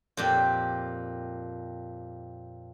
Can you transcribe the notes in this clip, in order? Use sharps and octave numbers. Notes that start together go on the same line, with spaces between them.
F2 A#2 G4